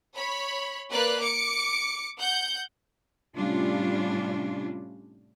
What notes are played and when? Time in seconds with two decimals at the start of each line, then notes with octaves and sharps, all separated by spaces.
0.16 C#5 B5
0.90 A#3 B4 D5 F#6
1.21 D6 C#7 D7
2.19 F#5 G6
3.35 A2 C3 G3 C#4 D4 F4